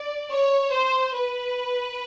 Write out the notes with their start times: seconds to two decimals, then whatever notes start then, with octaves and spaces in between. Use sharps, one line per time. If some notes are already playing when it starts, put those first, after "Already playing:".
Already playing: D5
0.31 C#5
0.74 C5
1.16 B4